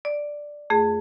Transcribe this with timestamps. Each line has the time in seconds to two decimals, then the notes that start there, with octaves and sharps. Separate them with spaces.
0.05 D5
0.70 F2 A3 G#4